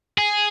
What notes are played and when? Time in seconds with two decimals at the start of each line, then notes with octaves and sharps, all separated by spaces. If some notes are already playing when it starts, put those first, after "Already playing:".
0.18 G#4